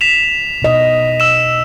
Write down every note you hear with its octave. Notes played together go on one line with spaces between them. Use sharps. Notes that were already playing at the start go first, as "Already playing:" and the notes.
B6 E7 F7
B2 D#5
E6 E7